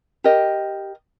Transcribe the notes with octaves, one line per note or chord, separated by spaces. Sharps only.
G4 A#4 D#5